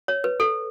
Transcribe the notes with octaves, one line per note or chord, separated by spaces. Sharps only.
C#5
B4
A4